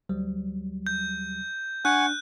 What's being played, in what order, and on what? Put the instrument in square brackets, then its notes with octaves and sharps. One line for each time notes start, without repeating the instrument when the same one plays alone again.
[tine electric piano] D2 F#3 G3
[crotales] G6
[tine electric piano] D4 [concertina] F#5 G#5 C#6 [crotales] F#6